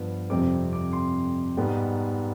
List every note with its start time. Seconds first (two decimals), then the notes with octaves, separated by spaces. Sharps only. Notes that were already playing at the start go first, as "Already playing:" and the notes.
Already playing: G2 F3 B3
0.30 F2 C3 G3 C4 D6
0.73 D6
0.93 C6
1.57 G#2 G3 B3 D#4